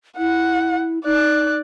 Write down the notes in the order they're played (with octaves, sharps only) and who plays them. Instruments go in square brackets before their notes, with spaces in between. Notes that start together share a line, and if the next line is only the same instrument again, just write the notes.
[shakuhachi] E4 [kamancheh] F#5
[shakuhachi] D#4 [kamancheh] D5 F#6